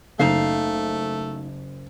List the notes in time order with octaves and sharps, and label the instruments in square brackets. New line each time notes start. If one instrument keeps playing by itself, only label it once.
[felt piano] F#1 [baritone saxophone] A3 [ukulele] D#4 F5